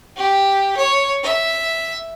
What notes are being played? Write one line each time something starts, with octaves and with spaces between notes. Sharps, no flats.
G4
C#5
E5